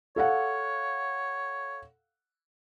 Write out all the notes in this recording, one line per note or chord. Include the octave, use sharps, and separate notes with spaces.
A4 C#5 F5 F#5